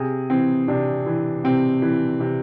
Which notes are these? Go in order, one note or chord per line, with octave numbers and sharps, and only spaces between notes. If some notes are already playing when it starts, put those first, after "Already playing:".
Already playing: C3 G#4
E3 C4
C3 D4
E3
C3 C4
E3
C3